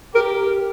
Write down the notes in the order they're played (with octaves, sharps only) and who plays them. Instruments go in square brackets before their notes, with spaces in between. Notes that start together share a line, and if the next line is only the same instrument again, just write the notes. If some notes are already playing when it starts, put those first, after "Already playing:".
[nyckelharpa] G4 [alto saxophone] A#4